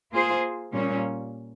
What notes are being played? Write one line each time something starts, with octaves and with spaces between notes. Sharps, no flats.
A#3 F4 G#4 C5
A#2 G3 C#4